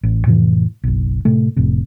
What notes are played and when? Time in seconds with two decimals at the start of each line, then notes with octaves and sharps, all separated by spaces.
0.03 A1
0.26 F2 A2 C3 E3
0.84 F#1 B1
1.25 A2 C3 A3
1.56 F1 A2 C3